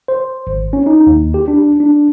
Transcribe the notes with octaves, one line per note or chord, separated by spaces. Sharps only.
C5
G#1
C#4
D#4
D#2
G4
D4
D4